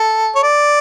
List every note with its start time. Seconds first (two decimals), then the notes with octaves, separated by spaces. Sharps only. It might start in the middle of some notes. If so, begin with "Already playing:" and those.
Already playing: A4
0.36 C#5
0.43 D5